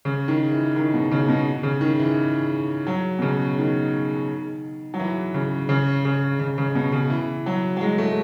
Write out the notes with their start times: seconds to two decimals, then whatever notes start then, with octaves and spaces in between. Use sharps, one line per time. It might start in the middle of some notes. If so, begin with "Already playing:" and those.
0.05 C#3
0.28 D#3
0.52 E3
0.76 D#3
0.94 B2
1.11 C#3
1.29 B2
1.63 C#3
1.81 D#3
1.99 E3
2.87 F#3
3.19 B2
3.22 C#3
3.58 D#3
4.94 F#3
5.00 E3
5.34 C#3
5.69 C#3
6.05 C#3
6.39 C#3
6.58 C#3
6.75 B2
6.92 C#3
7.10 E3
7.46 F#3
7.77 F#3
7.81 G#3
7.98 A3